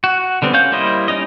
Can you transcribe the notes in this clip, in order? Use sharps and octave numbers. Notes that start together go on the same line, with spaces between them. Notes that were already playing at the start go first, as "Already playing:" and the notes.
F#4
D3 G3 B3 C4
C#4 F#4 F5 G6
G3 A#3 E4 C5 D#5
G3 C#4 D#4 D#5